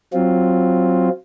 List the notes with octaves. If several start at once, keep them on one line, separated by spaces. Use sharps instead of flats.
F#3 C4 F4